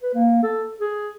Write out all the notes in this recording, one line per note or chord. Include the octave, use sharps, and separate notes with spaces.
B4
A#3
A4
G#4